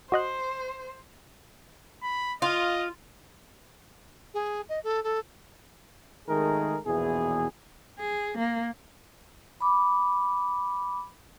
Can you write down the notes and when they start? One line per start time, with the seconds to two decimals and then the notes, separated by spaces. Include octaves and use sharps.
0.12 F#4 C5 D#5 F#6
2.03 B5
2.42 F4 D#5
4.34 G#4
4.69 D#5
4.84 A4
5.04 A4
6.28 G#1 D#3 G#3 A3 G#4 A#4
6.86 A#1 E2 B2 E3 G#4
7.99 G#4
8.39 A#3
9.61 B5 D6